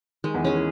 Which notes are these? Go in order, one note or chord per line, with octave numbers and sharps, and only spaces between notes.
D#3 G#3
E2 E3
D#3 C#4 G#4
E3